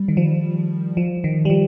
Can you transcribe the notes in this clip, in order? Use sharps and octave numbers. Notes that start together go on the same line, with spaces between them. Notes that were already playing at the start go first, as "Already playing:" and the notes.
Already playing: G3
D#3
F3
F3
D#3
G3
F3